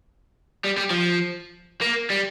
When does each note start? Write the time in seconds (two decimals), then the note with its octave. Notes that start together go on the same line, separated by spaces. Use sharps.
0.64 G3
0.77 G3
0.90 F3
1.81 A#3
2.10 G3